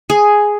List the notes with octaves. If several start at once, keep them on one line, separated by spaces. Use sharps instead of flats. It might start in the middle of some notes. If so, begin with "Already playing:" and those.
G#4